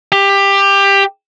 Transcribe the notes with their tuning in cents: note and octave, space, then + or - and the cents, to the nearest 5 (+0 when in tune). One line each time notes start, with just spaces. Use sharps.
G4 +15